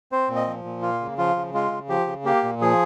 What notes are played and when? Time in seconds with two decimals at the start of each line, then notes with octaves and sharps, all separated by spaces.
0.12 C4 C5
0.29 A#2
0.36 D#5
0.47 F3
0.64 A#2
0.82 A#3 F4
1.01 C#3
1.18 F3 F4
1.36 C#3
1.54 G#3 F4
1.71 C#3
1.89 F3 G4
2.07 C#3
2.25 A#3 G4
2.43 A#2
2.61 F3 G#4